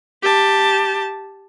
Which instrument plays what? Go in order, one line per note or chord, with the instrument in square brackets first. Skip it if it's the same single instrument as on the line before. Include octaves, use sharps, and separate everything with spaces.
[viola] G4 A5